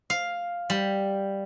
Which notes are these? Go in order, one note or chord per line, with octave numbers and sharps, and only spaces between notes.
F5
G3